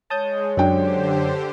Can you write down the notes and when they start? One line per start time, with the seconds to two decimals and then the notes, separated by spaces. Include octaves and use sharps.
0.10 G#3 C#5 A5 D#6 G6
0.57 F#2 D3 D4 G4 C5 G5